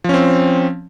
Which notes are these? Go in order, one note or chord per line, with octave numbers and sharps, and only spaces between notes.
F3 C4 C#4